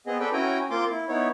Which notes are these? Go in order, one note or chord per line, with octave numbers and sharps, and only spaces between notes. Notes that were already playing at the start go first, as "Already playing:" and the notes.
B3 C4 G#4 D#5
C4 A4 B4 D5 G5
C#4 E4 F#4 G5 G#5 A#5
A#3 C4 F4 C6 D6
E4
B3 D#4 E4 C#5